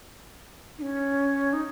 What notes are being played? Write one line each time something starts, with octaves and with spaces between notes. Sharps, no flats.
D#4
C#4
D#4